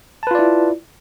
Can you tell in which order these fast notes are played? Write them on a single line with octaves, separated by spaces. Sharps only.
A5 B4 F4 D5 E4